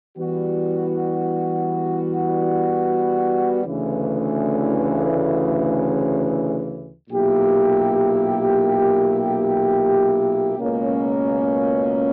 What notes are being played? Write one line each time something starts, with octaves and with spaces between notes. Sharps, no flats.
E3 G3 B3 F#4
D2 C#3 E3
B1 A#2 A#3 E4 G4
C#2 B2 A#3 C#4